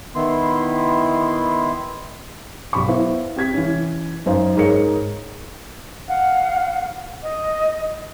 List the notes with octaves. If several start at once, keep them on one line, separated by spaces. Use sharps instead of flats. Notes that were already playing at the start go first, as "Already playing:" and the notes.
D#3 B3 E4 C6
B1 G4 B5 C#6
B3 E4 C5 F5
C3 G4 G#6 B6
E3 C#4
F#2 D#4 C5 F5
G#2 D#4 G#4 A#4 C#5 C#7
F5 F#5
D#5